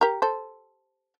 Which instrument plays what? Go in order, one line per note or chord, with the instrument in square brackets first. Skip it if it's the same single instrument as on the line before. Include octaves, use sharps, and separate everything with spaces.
[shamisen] G4 A#4
A4 C5